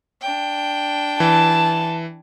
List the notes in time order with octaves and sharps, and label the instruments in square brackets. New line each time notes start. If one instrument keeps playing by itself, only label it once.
[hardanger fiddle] D4 G5
[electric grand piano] E3 [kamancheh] A5